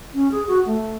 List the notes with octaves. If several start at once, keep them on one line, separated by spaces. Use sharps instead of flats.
C#4
G#4
F#4
A3